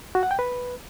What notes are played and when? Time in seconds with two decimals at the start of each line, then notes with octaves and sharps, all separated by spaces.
0.15 F#4
0.23 F#5
0.31 G5
0.39 B4